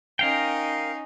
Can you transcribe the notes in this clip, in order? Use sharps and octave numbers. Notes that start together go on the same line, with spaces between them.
C#4 D#4 A#4 F5 G5